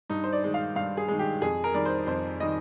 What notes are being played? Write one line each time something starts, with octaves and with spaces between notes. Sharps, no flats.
G2 D#4
C5
D5
D#3 G#3
F5
G2 F5
G#4
D#3 G#3
G4
F2 G#4
A#4
D#3 G3 D5
C5
F2 C5
D#3 G3 D#5